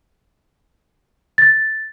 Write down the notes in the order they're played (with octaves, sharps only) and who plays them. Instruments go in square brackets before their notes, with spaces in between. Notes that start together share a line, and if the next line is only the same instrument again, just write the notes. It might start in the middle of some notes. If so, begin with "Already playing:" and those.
[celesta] A6